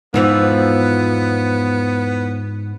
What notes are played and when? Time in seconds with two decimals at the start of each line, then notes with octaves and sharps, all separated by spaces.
0.14 E2 G#2 E3 F3 B3